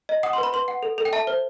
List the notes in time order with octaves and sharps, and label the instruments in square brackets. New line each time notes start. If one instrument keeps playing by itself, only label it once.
[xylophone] D#5
F#5 D#6
B4 C6
B5
B4 C6
F#5
A4
A4
G5
E5 A5
C5